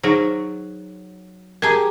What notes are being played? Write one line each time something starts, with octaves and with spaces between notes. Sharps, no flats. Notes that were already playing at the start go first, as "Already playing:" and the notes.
F#3 D#4 G#4 C5
G4 G#4 A#4 A5 A#5